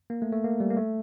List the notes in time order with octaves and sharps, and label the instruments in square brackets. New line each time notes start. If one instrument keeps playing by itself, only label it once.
[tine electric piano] A#3
A3
A3
A#3
G3
A#3
A3